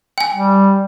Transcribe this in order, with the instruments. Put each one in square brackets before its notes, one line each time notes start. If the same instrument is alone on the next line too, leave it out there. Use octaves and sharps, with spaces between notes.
[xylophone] G5 G#5
[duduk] G3